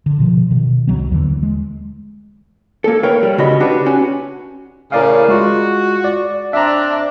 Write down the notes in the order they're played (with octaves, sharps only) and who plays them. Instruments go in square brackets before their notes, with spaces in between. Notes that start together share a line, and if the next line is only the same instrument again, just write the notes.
[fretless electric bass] D3
B2 F3 F#3
B2 D#3
C2 F2 F#3 B3
D#2 D3 E3
G#3
[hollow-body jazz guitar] A#3 A4
A#4 B4 C#5 F5 G5
G3
C#3 F#4 D#5 B5
D4 F#4 G4 B4
C#4 F#4
[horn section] A2 C#3 [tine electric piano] A#4 D5 F5
[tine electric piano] G#3 F4 [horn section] F#4
[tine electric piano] D5
[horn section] C4 D4 [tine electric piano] E5 A#5